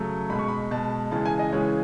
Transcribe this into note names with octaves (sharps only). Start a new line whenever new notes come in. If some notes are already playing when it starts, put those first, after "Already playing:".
Already playing: C#3 F#3 A3
B2 G#3 B5
C#6
B5
B2 G#3 A5
C#3 E3 G#3 A5
G#5
D#5
C#3 E3 G#3 C#5